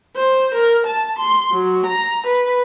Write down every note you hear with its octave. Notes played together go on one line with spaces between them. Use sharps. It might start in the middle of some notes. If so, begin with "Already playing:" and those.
C5
A#4
A5
C6
F#3
A#5
B4